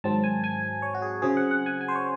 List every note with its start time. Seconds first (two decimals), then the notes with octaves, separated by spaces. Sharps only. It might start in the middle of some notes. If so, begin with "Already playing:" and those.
0.04 G#2 D#3 F#3 C4 A5
0.24 G#5
0.44 G#5
0.82 C#5
0.95 F#4
1.02 G#4
1.22 C#3 F#3 C4 G#4
1.37 F#5
1.51 F#5
1.66 G#5
1.81 G#5
1.88 C5
1.95 C#5